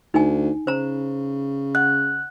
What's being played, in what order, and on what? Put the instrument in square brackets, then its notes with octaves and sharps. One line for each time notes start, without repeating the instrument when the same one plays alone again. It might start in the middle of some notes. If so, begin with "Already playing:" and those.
[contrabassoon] D2 [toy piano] D#4 G#5
[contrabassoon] C#3 [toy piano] C5 A#5
[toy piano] D#5 F#5 [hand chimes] F#6